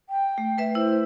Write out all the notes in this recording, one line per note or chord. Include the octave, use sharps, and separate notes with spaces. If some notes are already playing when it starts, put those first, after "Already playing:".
G5
A3
A3 B4 E5
E4 C5